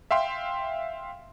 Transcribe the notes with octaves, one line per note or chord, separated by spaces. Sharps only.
E5 F5 G5 C6